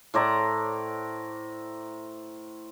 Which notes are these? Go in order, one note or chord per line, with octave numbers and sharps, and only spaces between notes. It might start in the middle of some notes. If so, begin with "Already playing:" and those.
A2 C5 D5 A#5